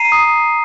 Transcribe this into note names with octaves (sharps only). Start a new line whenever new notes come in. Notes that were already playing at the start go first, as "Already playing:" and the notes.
Already playing: A#5 C7 D#7
D#6